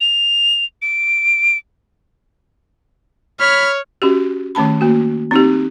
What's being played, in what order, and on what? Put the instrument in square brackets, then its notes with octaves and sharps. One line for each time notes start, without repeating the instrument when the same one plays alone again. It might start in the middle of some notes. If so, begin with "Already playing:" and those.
[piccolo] F7
D7
[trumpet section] C#5 [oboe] B5 [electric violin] F6
[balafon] C#4 F#4 G4
D#3 A3 C#4 A5 B5
A#3 F#4
C4 D#4 G4